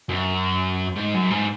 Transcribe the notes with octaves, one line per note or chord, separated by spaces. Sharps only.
F#2
G#2
F#2
G#2